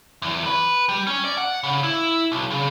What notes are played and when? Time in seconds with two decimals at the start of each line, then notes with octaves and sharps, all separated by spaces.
0.22 E2
0.46 B4
0.89 G3
1.07 C#4
1.25 D5
1.38 F#5
1.63 C#3
1.84 E4
2.32 B1
2.51 C#3